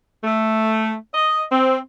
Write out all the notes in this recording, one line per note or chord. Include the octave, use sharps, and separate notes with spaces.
A3
D#5
C4